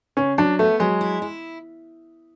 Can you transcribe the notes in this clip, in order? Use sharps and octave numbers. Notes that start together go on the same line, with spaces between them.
C#3 C#4
F#3 D4
A3 B3
F#3 G#3
E4
E4